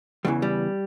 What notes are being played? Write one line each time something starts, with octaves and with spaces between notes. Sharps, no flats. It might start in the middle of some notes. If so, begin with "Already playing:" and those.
E2 C#3 E3 G3
G3